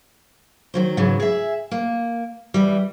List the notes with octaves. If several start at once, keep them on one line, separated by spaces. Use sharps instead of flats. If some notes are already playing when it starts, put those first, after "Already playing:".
D#3 F#3 C5
G#2 C#3 E3 F#3
G#4 E5
A#3
E3 G3